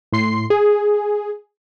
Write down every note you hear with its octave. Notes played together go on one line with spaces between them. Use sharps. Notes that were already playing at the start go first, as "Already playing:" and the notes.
A2 C6 C7
G#4